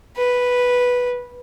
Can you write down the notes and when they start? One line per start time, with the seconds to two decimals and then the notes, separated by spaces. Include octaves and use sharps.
0.17 B4